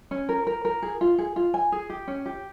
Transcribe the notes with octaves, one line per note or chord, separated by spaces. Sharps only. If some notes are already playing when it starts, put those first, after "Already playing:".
C#4
A#4
A#4
A#4
G#4
F4
G#4
F4
G#5
G#4
G4
C#4
G4